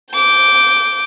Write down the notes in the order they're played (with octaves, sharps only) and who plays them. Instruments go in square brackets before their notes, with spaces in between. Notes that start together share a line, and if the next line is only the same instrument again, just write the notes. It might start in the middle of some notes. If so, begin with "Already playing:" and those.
[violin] D6 G6